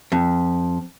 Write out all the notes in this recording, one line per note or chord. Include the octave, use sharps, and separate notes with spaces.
F2